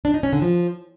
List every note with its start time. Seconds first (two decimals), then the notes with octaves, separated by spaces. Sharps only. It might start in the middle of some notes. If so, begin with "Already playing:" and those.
0.05 D4
0.14 D#4
0.23 C#4
0.33 D3
0.42 F3